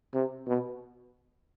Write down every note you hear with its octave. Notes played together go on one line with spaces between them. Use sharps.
C3
B2